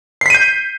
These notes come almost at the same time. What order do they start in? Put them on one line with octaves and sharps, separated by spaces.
C7 B6 D#7 G6